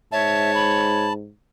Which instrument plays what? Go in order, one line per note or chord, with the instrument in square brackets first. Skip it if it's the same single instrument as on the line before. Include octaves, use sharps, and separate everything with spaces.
[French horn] G#2 [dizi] C#5 [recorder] E5 [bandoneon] A5
[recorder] B5